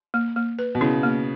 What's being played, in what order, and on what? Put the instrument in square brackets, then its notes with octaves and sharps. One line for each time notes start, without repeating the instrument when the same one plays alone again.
[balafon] A#3
A#3
B4
[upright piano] B2
[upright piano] C#3 [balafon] E4
[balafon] A#3